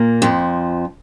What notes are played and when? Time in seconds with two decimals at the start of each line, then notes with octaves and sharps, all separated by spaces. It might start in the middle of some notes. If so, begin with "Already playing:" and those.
Already playing: A#2 A#3
0.22 F2 F3